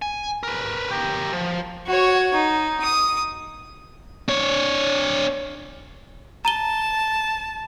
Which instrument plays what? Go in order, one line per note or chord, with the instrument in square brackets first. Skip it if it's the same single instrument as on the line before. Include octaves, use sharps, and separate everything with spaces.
[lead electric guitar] G#5
A#4 B4
G4 A#4
F3
[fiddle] F#4 C#5
D#4
D#6
[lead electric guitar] D4 C#5
[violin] A5 [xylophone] A#5 D#7 G7